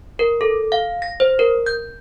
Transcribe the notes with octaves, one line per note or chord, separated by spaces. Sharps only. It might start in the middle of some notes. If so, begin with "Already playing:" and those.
A#4
A4
F5
A#6
C5
A#4
G6